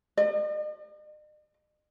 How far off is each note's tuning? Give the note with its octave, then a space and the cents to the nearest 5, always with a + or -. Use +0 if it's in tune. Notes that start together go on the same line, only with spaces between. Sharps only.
D#5 -45